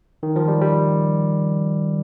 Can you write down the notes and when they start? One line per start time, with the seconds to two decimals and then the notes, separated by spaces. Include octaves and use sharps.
0.23 D#3
0.36 F3
0.48 G3
0.61 G3